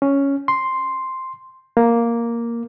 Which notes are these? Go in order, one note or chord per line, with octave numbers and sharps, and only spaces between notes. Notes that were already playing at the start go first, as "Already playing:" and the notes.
C#4
C6
A#3